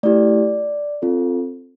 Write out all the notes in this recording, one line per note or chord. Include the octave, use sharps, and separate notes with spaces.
A3 E4 G4 D5
C4 F4 A4